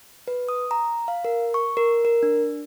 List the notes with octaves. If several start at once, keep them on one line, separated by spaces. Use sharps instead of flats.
B4
D#6
A#5
F5
A#4
C#6
A#4
A#4
D4